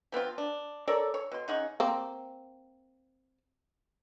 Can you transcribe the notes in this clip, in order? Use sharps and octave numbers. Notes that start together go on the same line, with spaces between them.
F3 B3 C4 F4
D4
A4 A#4 C#5 D5
C#5
B2 C6
C#3 D#4 F#5 C#6
A#3 C4